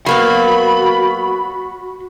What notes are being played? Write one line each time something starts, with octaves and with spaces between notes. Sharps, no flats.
F#3 A#3 B3 F#4 B5